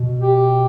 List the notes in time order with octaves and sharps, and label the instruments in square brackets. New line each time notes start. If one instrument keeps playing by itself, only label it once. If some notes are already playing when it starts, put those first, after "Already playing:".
Already playing: [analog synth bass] B2
[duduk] G4